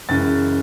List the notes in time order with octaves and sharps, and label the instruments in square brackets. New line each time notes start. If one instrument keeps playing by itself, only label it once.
[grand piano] F#2 C#3 E3 G#3 A6